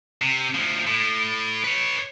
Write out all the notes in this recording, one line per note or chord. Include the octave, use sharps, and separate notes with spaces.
C3
D2 F3
A2
B4 C#5